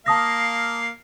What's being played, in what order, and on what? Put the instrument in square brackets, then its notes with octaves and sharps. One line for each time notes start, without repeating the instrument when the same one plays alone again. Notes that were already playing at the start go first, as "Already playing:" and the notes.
[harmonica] A#3 F5 [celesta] A5 D#6 A#6